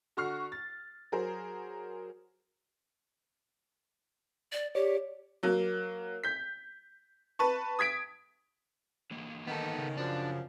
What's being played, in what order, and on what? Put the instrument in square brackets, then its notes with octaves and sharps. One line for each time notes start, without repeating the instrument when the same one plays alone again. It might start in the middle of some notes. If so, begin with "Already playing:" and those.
[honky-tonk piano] D3 F#4 C#6 F6 C7
A6
F#3 G#4 A#4 C5
[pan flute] D5
[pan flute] G4 [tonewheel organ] C#5 D5
[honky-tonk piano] F#3 A#3
G6 B6
B4 A5 C#6
D#6 G#6 B6 D7
[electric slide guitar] D3 E3 A#3
[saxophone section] D#3 [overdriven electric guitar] B3 A4
[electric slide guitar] C#3
[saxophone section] F#2 F3 [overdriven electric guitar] D4